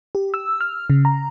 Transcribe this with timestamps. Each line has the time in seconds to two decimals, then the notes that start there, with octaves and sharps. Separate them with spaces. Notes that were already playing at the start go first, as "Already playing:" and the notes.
0.15 G4
0.34 E6
0.61 F6
0.90 C#3
1.05 A#5